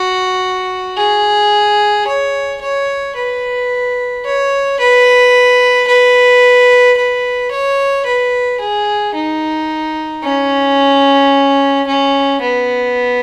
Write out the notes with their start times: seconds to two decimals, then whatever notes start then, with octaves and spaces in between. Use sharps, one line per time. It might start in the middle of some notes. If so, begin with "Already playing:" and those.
Already playing: F#4
0.97 G#4
2.07 C#5
2.61 C#5
3.16 B4
4.25 C#5
4.79 B4
5.88 B4
6.97 B4
7.51 C#5
8.06 B4
8.60 G#4
9.15 D#4
10.23 C#4
11.87 C#4
12.41 B3